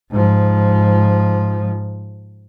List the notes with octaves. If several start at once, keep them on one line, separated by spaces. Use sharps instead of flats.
G#2 F3